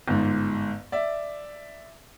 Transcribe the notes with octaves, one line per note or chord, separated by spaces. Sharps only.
G1 G#2
D5 E5